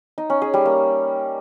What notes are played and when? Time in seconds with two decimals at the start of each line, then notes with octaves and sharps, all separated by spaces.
0.18 D#4
0.30 C#4
0.42 G#4
0.54 G3
0.66 A#3